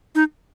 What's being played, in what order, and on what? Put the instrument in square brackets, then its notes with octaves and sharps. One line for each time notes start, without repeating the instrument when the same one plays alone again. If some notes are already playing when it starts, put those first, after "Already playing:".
[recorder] D#4